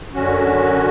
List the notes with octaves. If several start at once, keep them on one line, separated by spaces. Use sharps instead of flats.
F#2 D3 F#3 C#4 F#4